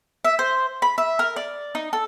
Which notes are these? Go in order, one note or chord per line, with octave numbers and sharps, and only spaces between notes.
E5
C5
B5
E5
A#4
D5
D#4
A4